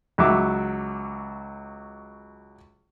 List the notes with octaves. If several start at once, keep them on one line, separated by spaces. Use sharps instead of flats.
C#2 F#3 E5 D6